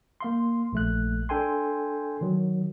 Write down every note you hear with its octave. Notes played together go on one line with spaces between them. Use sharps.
A#3 F5 C6
A#1 A3 F#6
D4 A4 G5 G#5 C6
D#3 F#3